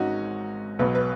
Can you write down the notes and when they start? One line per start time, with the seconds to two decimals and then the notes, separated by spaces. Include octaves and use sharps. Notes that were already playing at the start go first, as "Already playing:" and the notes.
Already playing: G#1 G#2 C#4 D#4 F#4
0.79 B1 B2 F#3 B4
0.95 B4